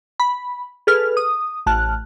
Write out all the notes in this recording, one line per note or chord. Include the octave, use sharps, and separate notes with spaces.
B5
G#4 A4 B4 F6
D#6
A1 A5 F6 F#6